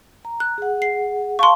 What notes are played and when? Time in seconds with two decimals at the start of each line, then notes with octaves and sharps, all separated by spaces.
0.25 A#5
0.40 F#6
0.58 G#4 F#5
0.82 C7
1.39 F5 A5 C6 C#6